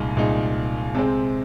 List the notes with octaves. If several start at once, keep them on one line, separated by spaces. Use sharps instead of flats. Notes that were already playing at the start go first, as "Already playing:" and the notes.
Already playing: C2 A#2 G#3 D#4
C2 A#2 G#3 D#4
C3 G#3 C4